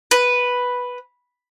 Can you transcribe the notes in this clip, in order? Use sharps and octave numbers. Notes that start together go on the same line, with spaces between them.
B4